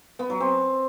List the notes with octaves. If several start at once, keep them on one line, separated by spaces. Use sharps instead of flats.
B3
F#3
C4